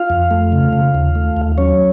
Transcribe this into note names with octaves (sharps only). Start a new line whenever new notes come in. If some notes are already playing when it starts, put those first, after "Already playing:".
Already playing: F4 F5
F2
A3
C#3
C#3
D#2
A3
D#2
F#3 C#4 C#5